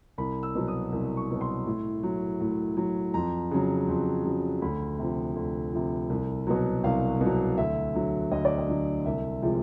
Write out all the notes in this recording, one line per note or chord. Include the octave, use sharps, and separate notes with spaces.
C2 B5
E6
B2 F#3
D#6
C2
C#6
B2 F#3
C6
A2
F#3
A2
F#3
F2 A#5
C#3 F#3
F2
C#3 F#3
D2 B5
C3 F3
D2
C3 F3
C2
B2 F#3
C2 F5
B2 F#3
D2 E5
D3 F#3
D2 D#5
D5
D#5
D3 F#3
C2 E5
C3 F3 G#3